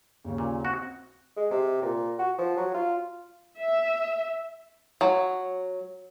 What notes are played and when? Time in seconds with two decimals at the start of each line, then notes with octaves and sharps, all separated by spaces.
0.25 D#2 C#3
0.38 A#2
0.65 C4 F#4
1.37 G#3
1.51 C3
1.82 A#2
2.19 F#4
2.38 F3
2.57 F#3
2.74 F4
3.57 E5
5.01 F#3